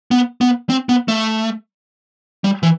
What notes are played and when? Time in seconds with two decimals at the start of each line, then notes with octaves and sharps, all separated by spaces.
0.11 B3
0.41 B3
0.70 C4
0.89 B3
1.08 A3
2.44 G3
2.63 E3